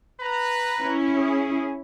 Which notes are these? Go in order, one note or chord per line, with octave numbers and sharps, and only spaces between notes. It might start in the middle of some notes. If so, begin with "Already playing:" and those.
B4 A#5
C#4 E4
G#4